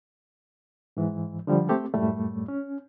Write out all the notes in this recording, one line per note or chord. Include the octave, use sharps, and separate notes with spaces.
G#2 E3
D3 F3 G3
A3 C4 G4 A4
F#2 A2 G3 A3
C#4